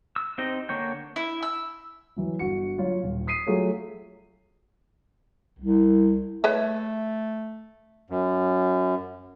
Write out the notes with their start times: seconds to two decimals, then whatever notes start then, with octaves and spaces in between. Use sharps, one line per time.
0.16 E6
0.38 C4 D#4 G4 C5 D#5
0.69 D3 A#3 C#5 G5
1.16 E4
1.43 E6
2.16 E3 F#3
2.39 G1 F#4 C#7
2.78 F#3 F4 C#5
3.03 D#1
3.27 D#6 B6 C7 D#7
3.46 F#3 A3 F4 G#4 C#5
5.59 C2
6.44 A3 B4 C#5 E5
8.10 F#2